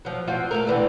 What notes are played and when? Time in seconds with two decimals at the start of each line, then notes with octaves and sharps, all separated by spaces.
0.05 F3 F#3
0.28 C4 F4 F#4
0.51 A3 A#3 A#4
0.67 D3 E3 C4